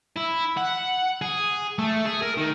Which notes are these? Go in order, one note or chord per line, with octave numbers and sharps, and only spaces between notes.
E4
F#5
G#4
A3
G#4
A#4
D#3